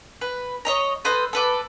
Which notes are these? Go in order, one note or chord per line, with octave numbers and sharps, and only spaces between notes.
B4
C#5 D#5 A#5
A4 B4 C5 D#5
A4 B4 D6